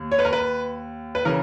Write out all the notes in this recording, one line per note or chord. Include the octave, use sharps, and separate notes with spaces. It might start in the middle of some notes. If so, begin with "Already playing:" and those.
Already playing: D#2
C#5
B4
A#4
B4
B4
C#3 E3 A#4